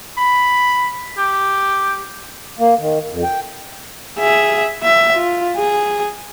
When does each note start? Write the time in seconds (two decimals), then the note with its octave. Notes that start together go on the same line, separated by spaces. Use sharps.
0.18 B5
1.18 G4
2.59 A#3
2.79 D#3
3.10 F2
3.24 G5
4.18 G#4 E5
4.83 E5
5.16 F4
5.57 G#4